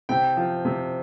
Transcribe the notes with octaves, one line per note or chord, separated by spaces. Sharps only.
C3 G5
F3
C3